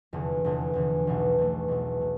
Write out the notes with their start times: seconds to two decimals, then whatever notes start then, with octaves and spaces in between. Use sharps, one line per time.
0.13 F1 E2 D3
0.44 F1 E2 D3
0.73 F1 E2 D3
1.07 B1 B2 A3
1.38 B1 B2 A3
1.68 B1 B2 A3
2.01 B2 A3